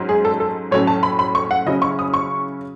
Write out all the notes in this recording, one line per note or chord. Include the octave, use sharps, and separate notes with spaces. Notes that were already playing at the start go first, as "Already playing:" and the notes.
Already playing: G#2 F#3 C#4
G#4
A4
A4
A2 F#3 A3 C#4 C#5
A5
B5
B5
C#6
F#5
C#3 F#3 C#4 E4 D#5
C#6
D#6
C#6